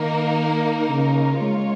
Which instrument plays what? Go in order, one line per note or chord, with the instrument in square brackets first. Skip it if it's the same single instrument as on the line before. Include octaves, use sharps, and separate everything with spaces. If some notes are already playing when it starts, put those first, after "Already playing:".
Already playing: [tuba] D#3 [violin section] A#3 D#4 A#4
[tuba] C#3
[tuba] G#3 [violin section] F4 C#5